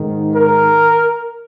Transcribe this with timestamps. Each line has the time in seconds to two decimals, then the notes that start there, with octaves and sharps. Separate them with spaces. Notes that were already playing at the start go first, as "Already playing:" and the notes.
Already playing: G#2 D#3
0.33 A#4